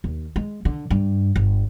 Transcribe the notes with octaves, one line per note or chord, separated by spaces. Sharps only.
D#2
G#3
D3
G2
G1